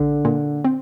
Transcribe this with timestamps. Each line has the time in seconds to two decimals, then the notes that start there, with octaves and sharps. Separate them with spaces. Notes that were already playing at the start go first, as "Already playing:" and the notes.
Already playing: A#1 D3
0.25 A#2
0.64 C4